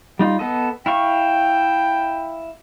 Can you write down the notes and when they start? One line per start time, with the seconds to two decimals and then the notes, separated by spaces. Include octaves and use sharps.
0.19 G3 D#4 F4
0.39 B3 A4 D#5
0.86 E4 F5 G5 C#6